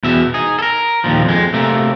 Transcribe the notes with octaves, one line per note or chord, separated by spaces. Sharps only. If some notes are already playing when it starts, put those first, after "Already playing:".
E2 B2 E5
D#4 G#4
A4 A#4
D#2 A#2 F3
F2 G#3
C3 A3 A#3